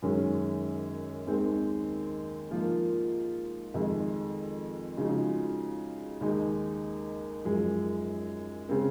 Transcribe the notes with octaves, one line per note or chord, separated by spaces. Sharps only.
F#2 D#3 G#3 C#4
D#2 D#3 G#3 C4
G#2 F3 A#3 F4
F2 D#3 G#3
C#3 F3 G#3 D#4 F#4
D#2 D#3 G#3 D#4
F#2 F3 G#3
C#3 G#3 C4